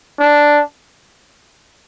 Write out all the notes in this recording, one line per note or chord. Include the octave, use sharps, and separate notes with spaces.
D4